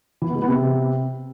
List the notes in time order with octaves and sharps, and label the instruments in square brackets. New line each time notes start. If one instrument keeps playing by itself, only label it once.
[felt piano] E3
B3
G#3
B3
C3